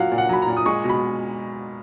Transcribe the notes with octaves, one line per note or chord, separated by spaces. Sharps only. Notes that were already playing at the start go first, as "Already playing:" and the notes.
Already playing: A#2 F#3 F5 F#5
A#2
F#5
F#3 B5
A#5
A#2
D#6
G#3 C#6
B2
B5